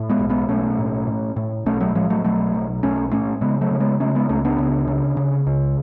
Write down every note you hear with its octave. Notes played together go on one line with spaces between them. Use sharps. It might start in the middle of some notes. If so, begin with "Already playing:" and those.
Already playing: A2
G#3 B3
B1
G#3 B3
B1 A3 C#4
A2
A2
A2
B1 A3 C#4
F#3 A3
A2 F3 G#3
F#3 A3
B1 F#3 A3
B1
B1 A3 C#4
A2 A3 C#4
C#3 G#3 B3
F#3 A3
C#3
G#3 B3
C#3 A3 C#4
G#3 B3
C#2 A3 C#4
B3 D4
C#3
C#3
C#3
C#2